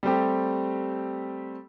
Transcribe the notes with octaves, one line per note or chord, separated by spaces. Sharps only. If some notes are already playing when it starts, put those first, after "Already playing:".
G3 A3 C4 G4